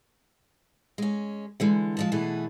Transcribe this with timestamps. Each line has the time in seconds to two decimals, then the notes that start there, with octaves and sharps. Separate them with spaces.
0.98 G#3 C#4
1.60 D3 E3 G#3
1.97 F3 G#3 A5
2.12 B2 E3 A3 B3 G#4